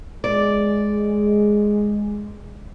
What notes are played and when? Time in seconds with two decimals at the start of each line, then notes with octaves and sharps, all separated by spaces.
0.24 G#3 D5